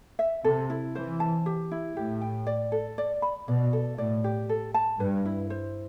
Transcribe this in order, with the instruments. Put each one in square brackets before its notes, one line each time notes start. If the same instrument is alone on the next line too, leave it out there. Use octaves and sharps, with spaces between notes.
[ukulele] E5
[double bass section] C3 [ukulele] A4
[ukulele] E4
[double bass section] E3 [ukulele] C5
[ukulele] A5
G4
E4
[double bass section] A2 [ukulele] G4
[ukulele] G5
D5
A4
D5
B5
[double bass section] B2 [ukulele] D5
[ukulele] A4
[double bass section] A2 [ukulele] D5
[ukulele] G4
A4
A5
[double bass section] G2 [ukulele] B4
[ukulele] E4
C5